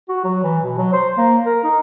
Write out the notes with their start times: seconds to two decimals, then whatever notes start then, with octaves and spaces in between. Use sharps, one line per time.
0.09 F#4
0.24 F#3
0.44 E3
0.62 B2
0.78 F#3
0.93 C5
1.18 A#3
1.46 A#4
1.64 D#4